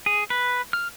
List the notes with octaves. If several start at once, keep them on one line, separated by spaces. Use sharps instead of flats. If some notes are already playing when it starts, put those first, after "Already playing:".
G#4
B4
F6